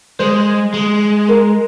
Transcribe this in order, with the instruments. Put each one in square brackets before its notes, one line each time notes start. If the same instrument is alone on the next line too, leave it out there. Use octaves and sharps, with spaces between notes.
[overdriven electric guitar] G#3 [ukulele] C5
[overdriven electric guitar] G#3
[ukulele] A#4